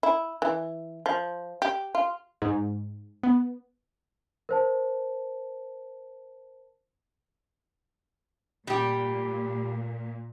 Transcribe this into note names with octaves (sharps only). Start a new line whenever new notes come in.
E4
E3
F3
G4
F4
G#2
B3
A#4 C5 A5
A#2 G3 G4